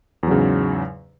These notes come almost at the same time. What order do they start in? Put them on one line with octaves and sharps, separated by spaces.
E2 F#3 C#3 G#2